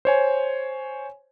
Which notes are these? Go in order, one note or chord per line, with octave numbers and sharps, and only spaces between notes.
C5 C#5 G#5